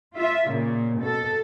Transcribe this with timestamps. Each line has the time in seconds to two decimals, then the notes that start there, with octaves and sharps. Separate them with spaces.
0.15 F4 E5
0.50 A#2 C#3
0.99 B2 A4